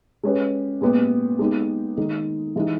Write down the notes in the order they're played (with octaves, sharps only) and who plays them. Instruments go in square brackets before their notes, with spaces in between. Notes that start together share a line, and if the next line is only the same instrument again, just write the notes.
[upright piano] G#3 C#4 G4 B4
A#2 G#3 B3 G4 B4
G#3 B3 D#4 G4
D#3 G#3 D#4
E3 G#3 D#4 G4